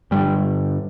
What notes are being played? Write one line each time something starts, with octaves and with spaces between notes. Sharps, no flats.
G2 D3 G3